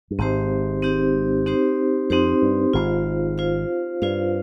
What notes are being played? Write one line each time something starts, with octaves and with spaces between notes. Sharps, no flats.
G2
G#1 G#2 C4 D#4 G4 C5
C4 D#4 G4 C5
C4 D#4 G4 C5
F2 C4 D#4 G4 C5
G2
G#1 G#2 F4 C5 F5
F4 C5 F5
G2 F4 C5 F5